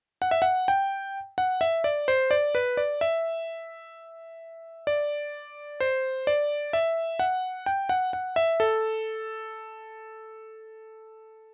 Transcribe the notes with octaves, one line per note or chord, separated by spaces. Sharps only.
F#5
E5
F#5
G5
F#5
E5
D5
C5
D5
B4
D5
E5
D5
C5
D5
E5
F#5
G5
F#5
F#5
E5
A4